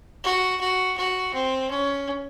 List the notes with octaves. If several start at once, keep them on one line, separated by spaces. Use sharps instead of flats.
F#4
F#4
F#4
C4
C#4